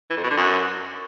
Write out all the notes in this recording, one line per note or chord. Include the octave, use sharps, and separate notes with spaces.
E3
F2
B2
D3
F#2